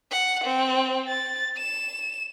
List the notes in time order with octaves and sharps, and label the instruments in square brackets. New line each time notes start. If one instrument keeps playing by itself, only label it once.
[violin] F#5
C4
A6
E7